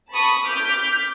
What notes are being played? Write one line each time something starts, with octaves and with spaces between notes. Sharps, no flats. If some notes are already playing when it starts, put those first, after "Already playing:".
A5 B5 C#6 D#6
D6 F6 G6 B6